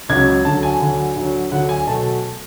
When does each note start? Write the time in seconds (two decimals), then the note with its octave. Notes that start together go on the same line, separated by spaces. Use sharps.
0.09 C#2 C#3 F#3 G#6
0.45 D2 D3 F#3 A5
0.63 G#5
0.80 D2 D3 F#3
1.16 D2 D3 F#3
1.51 D2 D3 F#3 F#5
1.69 G#5
1.87 B2 F#3 A3 A5